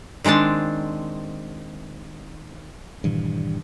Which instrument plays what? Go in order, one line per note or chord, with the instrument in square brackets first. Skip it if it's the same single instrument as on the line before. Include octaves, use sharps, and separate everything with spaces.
[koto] D#3 G#3 C4 D4 A5
[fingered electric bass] G2 A#2 D#3 E3